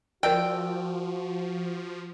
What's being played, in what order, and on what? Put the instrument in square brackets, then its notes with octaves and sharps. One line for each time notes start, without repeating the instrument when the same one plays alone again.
[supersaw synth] F3 [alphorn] F#4 [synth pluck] A#4 D5 E6 [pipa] G5